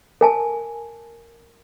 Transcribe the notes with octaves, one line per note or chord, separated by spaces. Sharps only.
A#4 G#5 A5